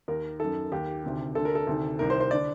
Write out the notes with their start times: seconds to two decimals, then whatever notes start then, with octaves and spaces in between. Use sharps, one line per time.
0.08 D#2 D#3 A#4
0.40 F#2 D#3 A4
0.72 D#2 D#3 G4
1.04 D2 C3 D#3
1.35 D2 D3 A4
1.45 A#4
1.55 A4
1.67 D2 C3 D#3
1.99 C2 C3 D#3 A#4
2.10 C5
2.20 C5
2.31 D3 D5